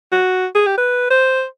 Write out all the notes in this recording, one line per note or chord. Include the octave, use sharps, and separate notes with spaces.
F#4
G#4
G4
B4
C5